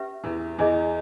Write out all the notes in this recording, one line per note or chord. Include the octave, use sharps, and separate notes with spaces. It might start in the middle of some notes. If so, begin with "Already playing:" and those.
Already playing: C#4 G4 B4 E5
E2 E3
E2 E3 E4 G#4 D#5 G#5